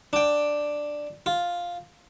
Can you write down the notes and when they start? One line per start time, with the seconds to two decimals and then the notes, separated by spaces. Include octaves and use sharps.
0.13 D4 G5
1.26 F4